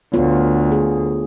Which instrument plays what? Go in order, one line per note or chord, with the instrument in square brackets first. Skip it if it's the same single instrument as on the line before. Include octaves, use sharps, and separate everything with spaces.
[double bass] D2 [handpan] B3 F4 C#5
[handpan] G#4